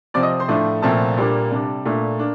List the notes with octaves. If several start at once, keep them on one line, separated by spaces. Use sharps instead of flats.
C3 F3 C4 D5 D6
D#5 D#6
C5 C6
A2 F3 A3 D4
C2 A#2 F3 A3 C4 A4 A5
A#2 G3 A#3 D4
C3 G3 D4
A#2 A3 D4
A#3 D4